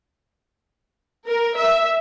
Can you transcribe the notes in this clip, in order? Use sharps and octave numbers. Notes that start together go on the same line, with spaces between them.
A#4
E5